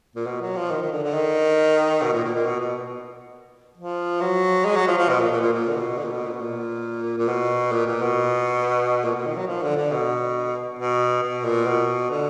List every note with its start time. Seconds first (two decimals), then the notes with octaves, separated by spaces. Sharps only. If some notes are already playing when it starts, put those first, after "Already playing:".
0.16 A#2
0.26 B2
0.41 F#3
0.56 F3
0.71 D#3
0.81 D#3
0.92 D3
1.03 D3
1.14 D#3
2.02 B2
2.13 A#2
2.24 A#2
2.35 A#2
2.46 B2
2.60 B2
3.78 F3
4.21 F#3
4.65 G#3
4.76 F#3
4.87 F3
4.98 F3
5.09 B2
5.20 A#2
5.31 A#2
5.42 A#2
5.52 A#2
5.68 D3
5.74 B2
5.97 D3
6.04 A#2
6.12 B2
6.26 A#2
6.33 B2
6.40 A#2
7.18 A#2
7.28 B2
7.72 A#2
7.87 A#2
8.02 B2
9.04 A#2
9.14 B2
9.26 D#3
9.36 F#3
9.48 F3
9.62 D3
9.77 D3
9.91 B2
10.79 B2
11.23 B2
11.45 A#2
11.67 B2
12.10 D3